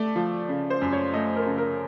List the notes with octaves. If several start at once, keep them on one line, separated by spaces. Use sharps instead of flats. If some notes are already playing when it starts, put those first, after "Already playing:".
Already playing: A3 D5
F3
C#3
C5
F#2
C#5
A3 D#5
A#4
C#3
A#4